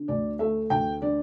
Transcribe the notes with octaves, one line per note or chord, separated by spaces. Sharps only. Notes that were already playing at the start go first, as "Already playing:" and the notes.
Already playing: D3
D2 D5
A3 E5
D2 G5
D3 D5